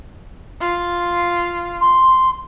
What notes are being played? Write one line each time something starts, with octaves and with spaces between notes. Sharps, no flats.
F4
C6